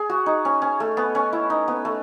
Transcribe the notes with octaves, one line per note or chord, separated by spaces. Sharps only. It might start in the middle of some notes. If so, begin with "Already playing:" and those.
Already playing: G#4
F#4
D#4
C#4
C#4
A3
B3
C#4
E4
D#4
B3
A3